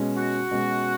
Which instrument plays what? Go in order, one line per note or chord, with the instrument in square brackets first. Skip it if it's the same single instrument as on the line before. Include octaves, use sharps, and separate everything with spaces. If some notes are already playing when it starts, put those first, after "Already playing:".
Already playing: [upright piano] B2 G#3 C#4
[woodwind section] F#4
[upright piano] B2 G#3 C#4